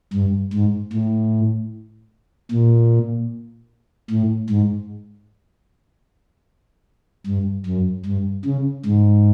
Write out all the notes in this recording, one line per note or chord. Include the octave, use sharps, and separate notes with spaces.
G2
G#2
A2
A#2
A2
G#2
G2
F#2
G2
C#3
G#2